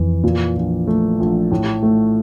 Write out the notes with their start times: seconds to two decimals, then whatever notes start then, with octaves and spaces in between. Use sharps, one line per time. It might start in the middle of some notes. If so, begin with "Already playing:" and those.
Already playing: F2 E3
0.24 A#2
0.56 A#1
0.87 A3
1.20 A#1
1.51 A2
1.83 A3